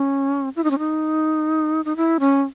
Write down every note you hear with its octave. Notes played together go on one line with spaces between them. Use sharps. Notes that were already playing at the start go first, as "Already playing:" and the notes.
Already playing: C#4
E4
D#4
C#4
D#4
D#4
E4
C#4